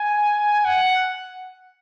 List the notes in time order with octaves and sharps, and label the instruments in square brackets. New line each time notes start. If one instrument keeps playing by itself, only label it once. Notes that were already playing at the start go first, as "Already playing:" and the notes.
Already playing: [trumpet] G#5
F#5